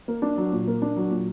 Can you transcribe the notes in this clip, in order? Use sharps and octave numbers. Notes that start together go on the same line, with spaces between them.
A#3
D4
F#3
A#2
A#3
D4
F#3
A#2